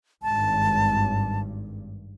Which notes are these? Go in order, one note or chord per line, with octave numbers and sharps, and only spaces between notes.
G#1 G2 A5